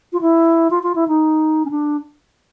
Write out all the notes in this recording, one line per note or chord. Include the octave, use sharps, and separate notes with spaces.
F4
E4
F4
F4
E4
D#4
C#4
D4